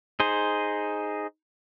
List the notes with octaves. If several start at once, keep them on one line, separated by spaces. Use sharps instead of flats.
D#4 G#4 C5